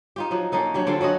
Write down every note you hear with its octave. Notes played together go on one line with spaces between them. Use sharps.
D#4 F4 G4
F3 F#3 D#4
A#3 C#4 D#4 A4
F#3 D4 G4
D3 C4 F4 A4
F#3 C#4 F#4 D#5